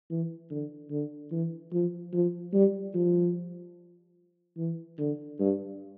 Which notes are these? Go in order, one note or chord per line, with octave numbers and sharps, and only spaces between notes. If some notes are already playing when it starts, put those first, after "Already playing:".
E3
D3
D3
E3
F3
F3
G3
F3
E3
D3
G2